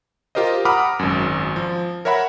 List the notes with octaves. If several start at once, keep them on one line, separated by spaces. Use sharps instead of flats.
F4 G4 A#4 C5 D#5
F#5 A#5 B5 D6 D#6 F6
G#1 F#2
F3
A#4 C#5 E5 F#5 B5